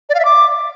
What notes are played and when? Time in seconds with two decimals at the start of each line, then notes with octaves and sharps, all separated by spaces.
0.09 D5
0.15 F5
0.20 E5
0.25 D6